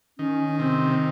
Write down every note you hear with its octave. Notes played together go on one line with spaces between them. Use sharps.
D#3 C#4
C#4
C3 C4